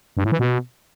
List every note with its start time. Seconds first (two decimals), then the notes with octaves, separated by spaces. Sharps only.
0.17 G2
0.24 A2
0.32 E3
0.39 B2